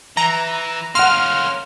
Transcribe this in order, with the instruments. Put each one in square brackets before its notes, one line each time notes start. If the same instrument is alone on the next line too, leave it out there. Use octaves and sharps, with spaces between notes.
[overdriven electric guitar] E3 [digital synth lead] A#5
[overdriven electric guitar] A#3 C#4 [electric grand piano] F#5 C6 [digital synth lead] F6